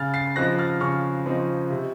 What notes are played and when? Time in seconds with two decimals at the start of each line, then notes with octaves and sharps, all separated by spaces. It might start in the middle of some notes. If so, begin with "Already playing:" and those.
Already playing: C#3 F6 A6
0.14 A6 C7
0.36 F3 C4 D#4 F#6 A#6
0.59 F6 A6
0.80 C#3 C#6 F6
1.26 F3 C4 D#4
1.70 C3